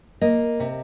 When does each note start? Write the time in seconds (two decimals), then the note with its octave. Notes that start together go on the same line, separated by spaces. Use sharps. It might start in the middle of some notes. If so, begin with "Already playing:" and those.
0.21 A#3 D#5
0.60 C3